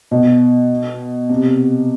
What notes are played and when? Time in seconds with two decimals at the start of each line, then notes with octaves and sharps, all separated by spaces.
0.11 B2
1.29 C3